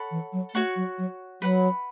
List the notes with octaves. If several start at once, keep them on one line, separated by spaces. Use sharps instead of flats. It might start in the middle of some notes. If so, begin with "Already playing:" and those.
Already playing: A4 C#5 F#5 B5
E3
F#3
A3 F#4 C#5 F#5 C#6
F#3
F#3
F#3 B4 F#5 B5